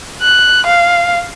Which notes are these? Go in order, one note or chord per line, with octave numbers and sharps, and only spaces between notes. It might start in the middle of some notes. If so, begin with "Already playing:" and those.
F#6
F5